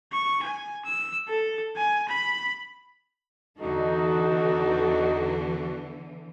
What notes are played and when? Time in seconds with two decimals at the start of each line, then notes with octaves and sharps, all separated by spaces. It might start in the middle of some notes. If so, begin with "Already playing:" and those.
0.12 C#6
0.43 G#5
0.85 E6
1.29 A4
1.76 G#5
2.08 B5
3.60 E2 D3 E3 D#4 F#4 A4